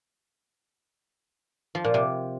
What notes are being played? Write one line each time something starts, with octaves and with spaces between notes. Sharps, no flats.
F3
A#2
C3